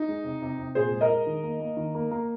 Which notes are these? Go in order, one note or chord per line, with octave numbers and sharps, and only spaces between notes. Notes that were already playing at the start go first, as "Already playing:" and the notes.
Already playing: D#4
G#3
C3
C3
C3
A#2 G#4 C5
G#3
A#4 D#5
G#3
D#3
A#3
A#3
D#3
A#3
A#3